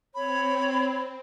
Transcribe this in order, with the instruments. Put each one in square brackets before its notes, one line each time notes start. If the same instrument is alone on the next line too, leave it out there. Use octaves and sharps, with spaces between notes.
[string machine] C4 [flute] C#5 [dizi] B5